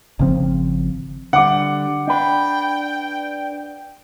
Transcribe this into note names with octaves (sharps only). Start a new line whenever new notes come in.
G#1 C#3 F3 C4
D3 G3 F#5 D6
D4 B4 G5